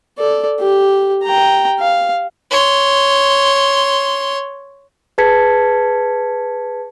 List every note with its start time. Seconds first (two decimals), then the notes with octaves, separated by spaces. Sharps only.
0.18 A4 D5
0.60 G4
1.24 G5 A#5
1.79 F5
2.51 C#5 C6
5.18 G#4 B4 A5 G#6 B6 C#7